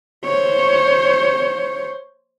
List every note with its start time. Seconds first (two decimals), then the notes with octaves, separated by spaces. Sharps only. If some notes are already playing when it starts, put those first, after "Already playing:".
0.25 C5 C#5